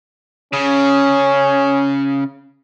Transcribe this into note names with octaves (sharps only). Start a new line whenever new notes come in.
C#3 C#4